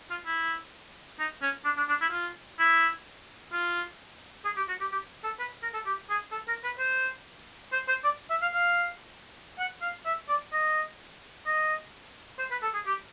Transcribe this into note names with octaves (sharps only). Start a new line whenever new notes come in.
F4
E4
D#4
C#4
D4
D4
D4
E4
F4
E4
F4
G#4
G4
F#4
G4
G4
A4
B4
A#4
A4
G4
G#4
A4
A#4
B4
C5
C5
C5
D5
E5
F5
F5
F#5
F5
E5
D5
D#5
D#5
C5
B4
A4
G#4
G4